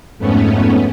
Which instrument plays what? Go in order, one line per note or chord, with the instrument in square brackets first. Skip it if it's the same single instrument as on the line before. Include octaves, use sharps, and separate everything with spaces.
[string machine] F2 G#2 A3 B3 C#4